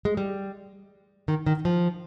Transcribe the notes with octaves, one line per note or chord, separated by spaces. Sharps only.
G#3
G3
D#3
D#3
F3